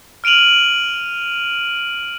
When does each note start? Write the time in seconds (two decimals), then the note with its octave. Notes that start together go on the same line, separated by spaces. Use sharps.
0.24 F6 D7 D#7 F7 F#7